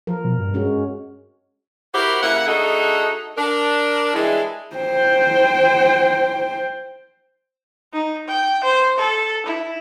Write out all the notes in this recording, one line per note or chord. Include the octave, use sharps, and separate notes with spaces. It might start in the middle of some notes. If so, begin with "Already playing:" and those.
F3 A#4
B2
G2
G#3 C#4 F#4
E4 F#4 G4 A#4 C5 F#5
C#3 A#3 E4 F#5
A3 D4 D#4 F#4 G#4 A4
D4 A#4
E3 G3 G#3 D4 E4
C5 G5
D#4
G5
C5
A4
E4